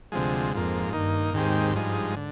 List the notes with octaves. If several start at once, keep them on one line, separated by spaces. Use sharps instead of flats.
D2 C3 F3 G#3
F2 G#2 F3 A#3
G2 D#3 A#3 D#4
D#2 G#2 D#3 G#3 C4 G4
G2 F3 G#3 D#4
D3